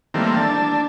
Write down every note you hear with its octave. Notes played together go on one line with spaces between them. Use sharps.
D#3 E3 G3 A3 A#3 C4
D4 A5